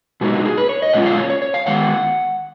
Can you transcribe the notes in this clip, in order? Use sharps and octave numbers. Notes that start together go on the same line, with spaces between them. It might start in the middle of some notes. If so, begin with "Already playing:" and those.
B2 G#3 D#4 F#4
F#4
G#4
B4
C#5
D#5
A#2 G#3 C#4 F4 F#5
F5
C#5
C#5
C#5
F5
D#3 G#3 B3 F#5